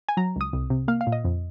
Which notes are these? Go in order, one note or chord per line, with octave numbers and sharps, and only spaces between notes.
G#5
F#3 A#5
C#2 D#6
C2
C3
A#3 F5
F5
A#2
D#5
F2